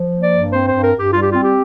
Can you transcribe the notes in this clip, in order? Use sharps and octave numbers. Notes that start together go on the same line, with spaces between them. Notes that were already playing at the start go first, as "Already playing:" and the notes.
Already playing: F3
A#3
D5
G2
C4 C5
C5
G2
A#4
G2 G4
G3 F4
G4
C4 F4
G4